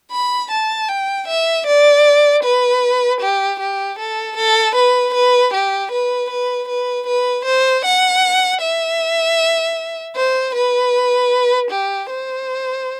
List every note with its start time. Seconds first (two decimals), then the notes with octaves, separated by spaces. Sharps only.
0.11 B5
0.51 A5
0.89 G5
1.28 E5
1.66 D5
2.43 B4
3.21 G4
3.60 G4
3.99 A4
4.37 A4
4.75 B4
5.14 B4
5.53 G4
5.92 B4
6.30 B4
6.69 B4
7.07 B4
7.45 C5
7.84 F#5
8.61 E5
10.16 C5
10.55 B4
11.71 G4
12.10 C5